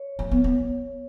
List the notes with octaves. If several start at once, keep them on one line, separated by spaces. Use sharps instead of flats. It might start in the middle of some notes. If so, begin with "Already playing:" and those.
Already playing: C#5
A3
B3
B3